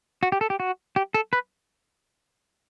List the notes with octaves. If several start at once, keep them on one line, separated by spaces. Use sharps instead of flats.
F#4
G4
A4
G4
F#4
G4
A4
B4